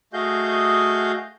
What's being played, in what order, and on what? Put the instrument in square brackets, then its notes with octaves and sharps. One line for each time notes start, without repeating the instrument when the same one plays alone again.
[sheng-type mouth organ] A3 F#4 G#4 D#5 F5 G6